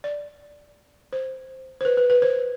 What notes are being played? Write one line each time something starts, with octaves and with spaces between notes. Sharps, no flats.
D5
C5
C5
B4
B4
B4
C5